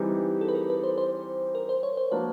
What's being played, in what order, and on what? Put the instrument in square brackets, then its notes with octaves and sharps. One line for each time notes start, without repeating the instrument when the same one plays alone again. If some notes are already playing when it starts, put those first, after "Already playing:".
Already playing: [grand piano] E3 G3 C4 D#4 G4 [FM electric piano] G#4
[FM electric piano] A4
B4
A#4
B4
C5
C5
A#4
C5
C#5
C5
[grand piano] F3 A#3 D4 F#4 [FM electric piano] B4